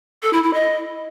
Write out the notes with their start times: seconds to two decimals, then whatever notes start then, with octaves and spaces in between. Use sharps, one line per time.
0.23 A4
0.33 E4
0.43 E4
0.54 D#5